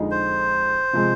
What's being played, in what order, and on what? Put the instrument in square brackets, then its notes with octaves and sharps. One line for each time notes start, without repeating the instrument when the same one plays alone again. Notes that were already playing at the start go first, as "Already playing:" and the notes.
Already playing: [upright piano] F2 D3 G#3 D#4
[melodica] C5
[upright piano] C3 F3 G#3